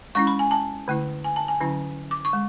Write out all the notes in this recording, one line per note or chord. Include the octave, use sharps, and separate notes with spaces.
G#3 C#4 E4 C#6
B5
G#5
A5
D3 A3 E4
G#5
A5
G#5
D3 F#3 C#4 E4
D6
C#6
G#3